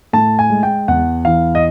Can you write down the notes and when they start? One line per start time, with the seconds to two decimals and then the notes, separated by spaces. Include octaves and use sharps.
0.13 A2 A5
0.39 G#5
0.50 G#3
0.63 G5
0.88 E2 F#5
1.25 E3 F5
1.55 D#5